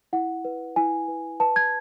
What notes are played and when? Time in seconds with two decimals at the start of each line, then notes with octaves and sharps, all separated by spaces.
0.13 E4 F#5
0.45 B4
0.76 E4 G#5
1.08 B4
1.40 B4 A5
1.56 G#6